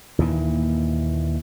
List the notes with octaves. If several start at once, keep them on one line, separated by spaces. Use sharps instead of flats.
D#2 A#2 E3